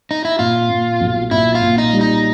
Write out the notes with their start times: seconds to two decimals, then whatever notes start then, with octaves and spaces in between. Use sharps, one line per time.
0.11 D#4
0.25 E4
0.39 A#2 F4
0.69 A#2
1.01 B1
1.31 A#2 E4
1.55 F4
1.62 A#2
1.78 D#4
1.93 G3
2.01 D#4